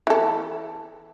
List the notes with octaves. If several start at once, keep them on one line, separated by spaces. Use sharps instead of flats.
E3 A4